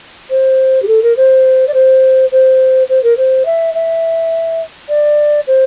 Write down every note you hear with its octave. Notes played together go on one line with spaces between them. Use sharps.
C5
G4
A4
A#4
C5
D5
C5
C5
C5
A#4
C5
E5
E5
D5
C5